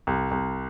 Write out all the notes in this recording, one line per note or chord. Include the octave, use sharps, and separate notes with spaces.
C2
C2